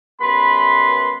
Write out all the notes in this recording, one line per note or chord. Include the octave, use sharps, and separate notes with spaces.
F#2 G3 B3 B4 B5 C6